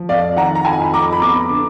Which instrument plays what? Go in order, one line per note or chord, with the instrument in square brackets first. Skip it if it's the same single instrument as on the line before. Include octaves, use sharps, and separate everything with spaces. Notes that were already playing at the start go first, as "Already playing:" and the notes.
Already playing: [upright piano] F3
F2 D5 F5
D#3 F#5 A#5
A#5
F2 G#5 B5
B5
F2 A#5 D6
B5
B3 A#5 D6
D3